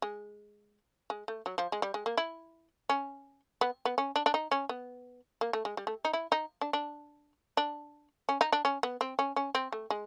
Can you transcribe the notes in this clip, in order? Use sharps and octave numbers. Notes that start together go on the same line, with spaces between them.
G#3
G#3
A3
F#3
F3
G#3
G3
G#3
A#3
E4
C#4
B3
B3
C#4
D4
D4
D#4
C#4
B3
A#3
A3
G#3
G3
A3
D#4
E4
D#4
D4
D4
D4
C#4
D#4
D4
C#4
B3
C4
C#4
C#4
C4
A3
G#3